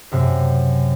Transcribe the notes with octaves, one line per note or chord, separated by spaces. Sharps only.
F#2 C3